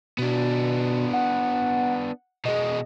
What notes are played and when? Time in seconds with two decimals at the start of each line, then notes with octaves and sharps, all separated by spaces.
0.18 B2 B3 D4
1.13 F#5
2.45 B2 G#3 D#5